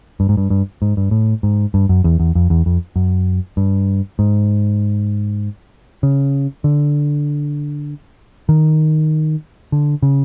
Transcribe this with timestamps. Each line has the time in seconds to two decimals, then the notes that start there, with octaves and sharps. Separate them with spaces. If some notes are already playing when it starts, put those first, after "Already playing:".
0.20 G2
0.29 G#2
0.37 G2
0.50 G2
0.82 G#2
0.97 G2
1.11 A2
1.43 G#2
1.74 G2
1.89 F#2
2.04 E2
2.20 E2
2.35 F2
2.50 E2
2.66 F2
2.96 F#2
3.57 G2
4.19 G#2
6.03 C#3
6.64 D3
8.49 D#3
9.72 D3
10.03 C#3